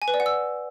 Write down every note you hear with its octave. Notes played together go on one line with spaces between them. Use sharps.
G#5
B4
D5
F#5
E6